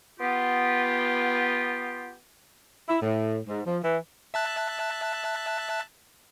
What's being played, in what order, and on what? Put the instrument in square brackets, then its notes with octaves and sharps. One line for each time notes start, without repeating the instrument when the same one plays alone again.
[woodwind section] B3 F4 G4
[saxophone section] E4
A2
G#2
F3
E3
[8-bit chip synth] E5 A5 F#6